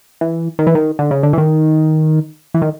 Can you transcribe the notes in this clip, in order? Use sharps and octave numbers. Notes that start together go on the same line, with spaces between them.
E3
D#3
E3
D#3
D3
C#3
D3
E3
D#3
E3
D#3